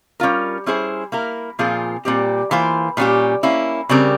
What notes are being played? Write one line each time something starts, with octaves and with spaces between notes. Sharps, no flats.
G3 C#4 F4 A#4
G3 C#4 E4 G#4 C5
A#3 E4 A#4
A#2 F3 C4 F4 G#4
A#2 G3 C4 G4
E3 A#3 F4 C5
A#2 G3 C#4 G4
A#3 C#4 E4
C#3 G3 C4 G4 A#4